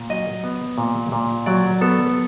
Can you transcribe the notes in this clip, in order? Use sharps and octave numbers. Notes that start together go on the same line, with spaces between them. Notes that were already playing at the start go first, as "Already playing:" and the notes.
Already playing: A#2
F#3 D#5
B3
A#2
A#2
F#3 D5
B3 A4